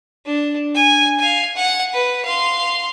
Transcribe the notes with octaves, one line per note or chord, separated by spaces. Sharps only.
D4
G#5
F5 G#5
F#5
B4
F5 C6